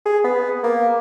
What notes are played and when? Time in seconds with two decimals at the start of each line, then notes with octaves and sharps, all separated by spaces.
0.06 G#4
0.24 B3
0.64 A#3